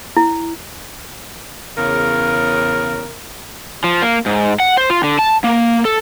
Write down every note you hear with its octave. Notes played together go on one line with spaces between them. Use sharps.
E4
E2 C#3 A#4
F3
A#3
G#2
F#5
C5
F4
D3
A5
A#3
A4